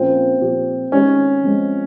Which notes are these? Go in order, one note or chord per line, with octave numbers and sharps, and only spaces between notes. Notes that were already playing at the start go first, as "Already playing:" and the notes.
Already playing: A#2 F3 A#3 C4 C#4 F4
A#2 F3 C4 G4
D#3 G#3 C4 C#4 G4
F3 G#3 C4 F4